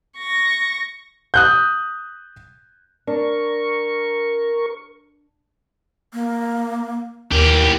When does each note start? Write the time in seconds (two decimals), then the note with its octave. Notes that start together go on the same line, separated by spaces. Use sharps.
0.18 C#6 A#6
1.34 D#6 F#6 G6
3.07 D4 A#4 C#6
6.14 A#3
7.32 D#2 E3 G4 A#4